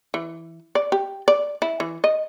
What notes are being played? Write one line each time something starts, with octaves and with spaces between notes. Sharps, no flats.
E3
D5
G4
D5
E4
E3
D#5